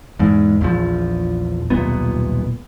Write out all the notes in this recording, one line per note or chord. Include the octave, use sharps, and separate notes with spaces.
E2 G#2
A#1 E2 F3
D#1 B1 A#2 B3